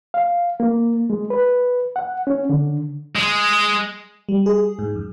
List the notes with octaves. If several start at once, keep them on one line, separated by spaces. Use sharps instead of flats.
F5
A#3
G#3
B4
F#5
C#4
D3
G#3
G3
G#4
G#2
F#2